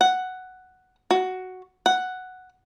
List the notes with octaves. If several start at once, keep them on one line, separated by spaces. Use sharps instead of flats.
F#5
F#4
F#5